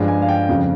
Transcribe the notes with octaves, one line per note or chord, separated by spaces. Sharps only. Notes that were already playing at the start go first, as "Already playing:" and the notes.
Already playing: G2 F3 G#3
G#5
F5
G5
F2 C#3 F3